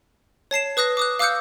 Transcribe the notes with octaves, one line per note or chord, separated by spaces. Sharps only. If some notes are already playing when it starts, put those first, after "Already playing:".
C#5 A5 C7 E7
B4 D#6 F#6 A#6
D6 D#6 F#6
F5 D6 E6 F#6 G6 C#7